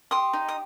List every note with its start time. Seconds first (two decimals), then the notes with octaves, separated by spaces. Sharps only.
0.11 G4 C6 D#6
0.33 D#4
0.48 D#6